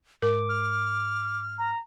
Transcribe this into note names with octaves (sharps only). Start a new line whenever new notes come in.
G#2 A#4 D6
F6
A#5